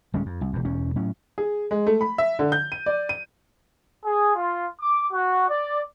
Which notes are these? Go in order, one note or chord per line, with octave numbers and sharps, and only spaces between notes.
D1 G3 G#3 C#4
F2
C2
E1 E2
E1 E2 C#4
A2 F#3 C#4
G#4
G#3
A3
B5
E5
D3
G6
D#7
D5
D#7
G#4
F4
D6
F#4
D5